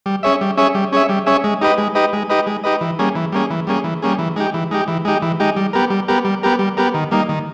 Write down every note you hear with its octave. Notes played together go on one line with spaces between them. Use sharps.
G3
C#4 G#4 C#5 E5
G3
C#4 G#4 C#5 E5
G3
C#4 G#4 C#5 E5
G3
C#4 G#4 C#5 E5
G#3
D#4 G4 B4 D#5
G#3
D#4 G4 B4 D#5
G#3
D#4 G4 B4 D#5
G#3
D#4 G4 B4 D#5
E3
G3 A#3 C#4 G#4
E3
G3 A#3 C#4 G#4
E3
G3 A#3 C#4 G#4
E3
G3 A#3 C#4 G#4
E3
G#3 D#4 G4
E3
G#3 D#4 G4
E3
G#3 D#4 G4
E3
G#3 D#4 G4
G3
B3 G4 A#4
G3
B3 G4 A#4
G3
B3 G4 A#4
G3
B3 G4 A#4
D#3
G3 A#3 D#4
D#3